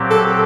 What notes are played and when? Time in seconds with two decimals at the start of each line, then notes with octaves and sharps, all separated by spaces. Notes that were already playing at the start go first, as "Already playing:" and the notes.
Already playing: A#2 F#3 C4 G4
0.10 A4
0.27 A4